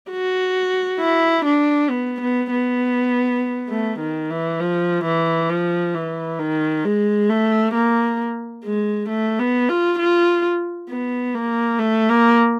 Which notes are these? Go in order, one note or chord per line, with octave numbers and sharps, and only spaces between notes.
F#4
E4
D4
B3
B3
B3
A3
D#3
E3
F3
E3
F3
E3
D#3
G#3
A3
A#3
G#3
A3
B3
F4
F4
B3
A#3
A3
A#3